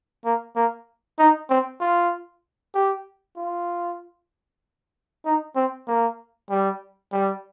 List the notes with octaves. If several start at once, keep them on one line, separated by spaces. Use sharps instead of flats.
A#3
A#3
D#4
C4
F4
G4
F4
D#4
C4
A#3
G3
G3